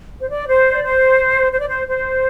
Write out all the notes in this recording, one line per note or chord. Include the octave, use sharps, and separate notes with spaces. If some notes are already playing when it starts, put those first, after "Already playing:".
C5
D5
C5
D5
C5
C5
D5
C5
C5